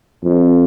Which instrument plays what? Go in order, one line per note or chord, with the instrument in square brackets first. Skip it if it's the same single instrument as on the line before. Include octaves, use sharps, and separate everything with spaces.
[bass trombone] F2